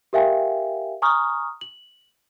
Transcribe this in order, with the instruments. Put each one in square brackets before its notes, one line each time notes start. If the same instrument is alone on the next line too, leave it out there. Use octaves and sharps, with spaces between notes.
[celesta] G4 A#4 E5 F5 G5 G#5
G#5 A#5 C#6 D#6 F6
F#7